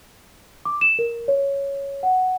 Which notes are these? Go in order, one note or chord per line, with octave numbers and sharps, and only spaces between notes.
D6
E7
A#4
C#5
F#5